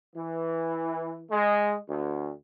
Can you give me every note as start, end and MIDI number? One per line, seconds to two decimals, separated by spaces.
0.16 1.25 52
1.31 1.77 56
1.89 2.30 38